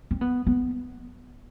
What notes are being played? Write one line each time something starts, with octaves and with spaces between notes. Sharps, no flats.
C4
B3
B3